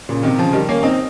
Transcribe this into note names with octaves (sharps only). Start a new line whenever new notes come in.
A#2 C#3
C3 D#3
C#3 F3
D#3 G3
A#3 C#4
C4 D#4